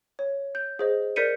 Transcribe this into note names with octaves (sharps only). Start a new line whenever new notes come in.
C#5
G6
G#4 C5 D#5
A#4 D5 G6 B6 C#7 D#7